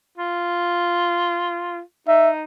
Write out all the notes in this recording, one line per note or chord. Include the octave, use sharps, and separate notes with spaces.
F4
D#4 E5